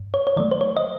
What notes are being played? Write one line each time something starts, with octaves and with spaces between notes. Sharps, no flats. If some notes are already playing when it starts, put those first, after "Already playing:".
Already playing: G2
C#5
C#5
D#3 F#3 A3 D5
C5
C#5
D#5